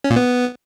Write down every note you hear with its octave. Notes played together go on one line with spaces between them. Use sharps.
C#4
A#2
B3